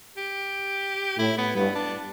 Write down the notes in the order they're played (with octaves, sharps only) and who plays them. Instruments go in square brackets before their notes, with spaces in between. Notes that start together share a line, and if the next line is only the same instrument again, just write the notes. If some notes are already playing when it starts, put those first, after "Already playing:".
[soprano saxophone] G4
[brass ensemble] A2 [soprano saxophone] E4
[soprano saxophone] B3
[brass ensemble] G2 [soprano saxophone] B3
[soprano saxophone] D4